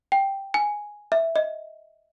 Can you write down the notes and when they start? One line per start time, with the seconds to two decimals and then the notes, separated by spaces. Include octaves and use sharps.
0.12 G5
0.54 G#5
1.12 E5
1.36 D#5